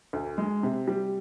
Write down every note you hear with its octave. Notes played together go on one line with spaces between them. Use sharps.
D2
G#3
C3
G3